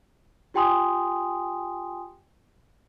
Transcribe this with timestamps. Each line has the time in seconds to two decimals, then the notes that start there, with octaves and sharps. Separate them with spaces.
0.54 F4 G4 G5 G#5 C6 D#6